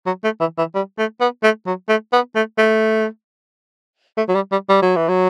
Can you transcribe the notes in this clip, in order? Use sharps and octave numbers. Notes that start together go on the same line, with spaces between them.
F#3
A3
E3
E3
G3
A3
B3
A3
F#3
A3
B3
A3
A3
A3
F#3
G3
G3
G3
F#3
E3
F#3